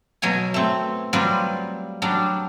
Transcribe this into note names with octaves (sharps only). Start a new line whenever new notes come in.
B2 F#3 C#5 G#5
A3 C4
F#3 G3 C4 F4 B4
F#3 G3 D4